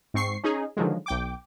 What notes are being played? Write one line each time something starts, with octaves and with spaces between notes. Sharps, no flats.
G#2 C4 C#6 C7
C#4 D#4 G#4
D3 D#3 F3 F#3 G#3
B1 G5 D6